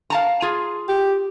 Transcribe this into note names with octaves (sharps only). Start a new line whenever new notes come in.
F5 A5 A#5
F4 G#4
G4